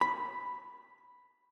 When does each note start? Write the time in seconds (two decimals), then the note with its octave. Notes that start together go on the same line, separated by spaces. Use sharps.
0.01 B5